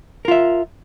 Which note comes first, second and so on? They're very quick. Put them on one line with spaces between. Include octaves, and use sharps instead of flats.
A#4 F4 E5